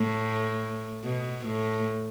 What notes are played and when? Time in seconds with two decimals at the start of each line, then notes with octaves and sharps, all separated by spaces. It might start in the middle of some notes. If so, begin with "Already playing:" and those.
Already playing: A2
1.04 B2
1.46 A2